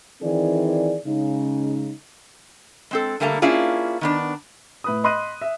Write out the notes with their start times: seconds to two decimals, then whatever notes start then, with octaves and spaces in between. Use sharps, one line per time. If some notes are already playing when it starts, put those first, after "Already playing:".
0.21 D#3 E3 C4 G#4 D5
1.05 C#3 G#3 D#4
2.91 G#3 C4 A4
3.20 D3 G3 A3 A#3 G#5 A#5
3.42 A#3 C#4 D4 E4 F4 G#4
4.01 D#3 B3 D4
4.84 A2 B4 D#6
5.04 D#5 B5 C6 D#6 F#6 D#7
5.41 E5